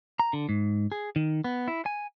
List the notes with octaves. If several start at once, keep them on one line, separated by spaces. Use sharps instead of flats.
A#5
D3
G#2
G#4
D#3
B3
E4
G#5